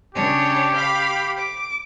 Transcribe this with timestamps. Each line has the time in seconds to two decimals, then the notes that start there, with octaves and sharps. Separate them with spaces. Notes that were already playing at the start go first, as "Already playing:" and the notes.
0.15 C#3 D4 G4 C#5
0.75 F5 B5
1.39 D6